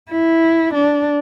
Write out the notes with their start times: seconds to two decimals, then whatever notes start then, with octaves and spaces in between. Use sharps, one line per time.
0.10 E4
0.74 D4